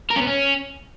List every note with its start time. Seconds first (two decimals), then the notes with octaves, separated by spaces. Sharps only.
0.10 A#4
0.16 C#4
0.21 B3
0.27 C#4